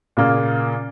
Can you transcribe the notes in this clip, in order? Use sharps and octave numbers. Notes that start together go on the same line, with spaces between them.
A#2 C#3 A#3 F4